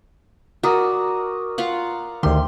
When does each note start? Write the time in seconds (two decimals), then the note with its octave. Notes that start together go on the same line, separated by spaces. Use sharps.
0.63 F#4 A#4 D5 D#6
1.58 F4 F5 F#5
2.23 D2 D#3 G4 C6